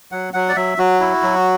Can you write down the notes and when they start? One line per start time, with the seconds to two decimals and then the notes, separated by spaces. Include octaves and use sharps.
0.12 F#3 F#5
0.33 F#3 F#5
0.49 D5
0.56 F#3 E5
0.78 F#3 F#4
1.00 E4
1.23 F#3